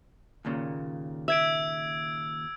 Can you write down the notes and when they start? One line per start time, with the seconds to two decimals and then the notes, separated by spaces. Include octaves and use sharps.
0.45 D#2 A#2 C#3
1.28 E5 E6 G#6 D7